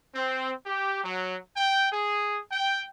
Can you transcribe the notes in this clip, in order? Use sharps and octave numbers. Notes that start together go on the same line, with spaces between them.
C4
G4
F#3
G5
G#4
G5